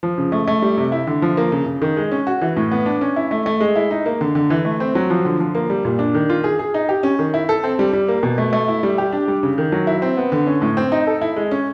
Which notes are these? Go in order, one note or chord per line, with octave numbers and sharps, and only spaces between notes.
F3
C#3
A3
A3
G3
C3
E4
D3
F3
A#3
C#3
C#3
D#3
G#3
C#4
F#4
E3
A2
B3
D4
C#4
E4
A3
A3
G#3
E4
D#4
A#3
D3
D3
E3
A3
C4
F#3
F3
D3
F3
A#3
G3
A#2
D4
D#3
F4
G#4
G#4
D#4
G4
C#4
D#3
E4
A4
C4
G3
G3
A#3
B2
A3
A3
E4
G3
G4
D4
G3
C#3
D#3
F#3
E4
C4
B3
D3
C#4
A2
C4
D#4
A4
E4
G#3
C#4